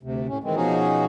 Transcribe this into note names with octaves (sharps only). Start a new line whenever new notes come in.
D2 C3
A2 C#4
D#3 E3 G#3 C4
B2 F3 C#4 D#4 F#4 G#4